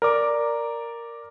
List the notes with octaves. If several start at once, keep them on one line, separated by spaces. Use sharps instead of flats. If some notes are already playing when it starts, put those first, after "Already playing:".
A#4 D5 D6